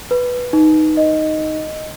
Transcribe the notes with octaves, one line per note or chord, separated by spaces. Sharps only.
B4
D#4
D#5